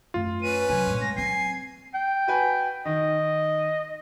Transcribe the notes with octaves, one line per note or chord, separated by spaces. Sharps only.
F#2 A3 F4
C#4 B4 D#7
C3 F#3 G#5
G2 A#2
G#3 A#6
F#3 C4 G#5 C7
G5
F#4 B4 G#5
D#3 D#5